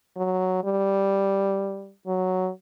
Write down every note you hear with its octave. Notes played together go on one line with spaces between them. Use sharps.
F#3
G3
F#3